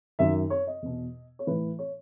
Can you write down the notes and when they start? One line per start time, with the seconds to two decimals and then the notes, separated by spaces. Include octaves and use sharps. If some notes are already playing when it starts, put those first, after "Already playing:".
0.19 F#2 D#3 E5
0.50 C#5
0.67 D#5
0.82 E2 B2
1.39 C#5
1.47 A2 E3 B4
1.79 C#5